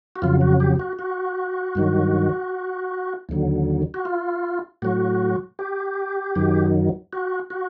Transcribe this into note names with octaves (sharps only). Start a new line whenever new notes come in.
F#4
F2 C#3 F#3 F4
F#4
G4
F#4
F#4
G2 D#3 F#3
D#2 D3 F#3
F#4
F4
A2 F#3 F#4
G4
F#2 D#3 F#3
F#4
F#4